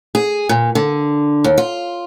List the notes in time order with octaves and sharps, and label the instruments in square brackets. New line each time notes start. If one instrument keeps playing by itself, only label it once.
[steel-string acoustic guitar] G#4
A#2
D3
D#2
F4